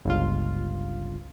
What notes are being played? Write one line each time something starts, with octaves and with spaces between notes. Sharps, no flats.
G1 C#2 F4